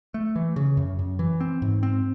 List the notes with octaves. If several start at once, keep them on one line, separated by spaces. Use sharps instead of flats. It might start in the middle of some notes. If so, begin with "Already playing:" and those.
A3
E3
C#3
F#2
F#2
E3
C4
G#2
C4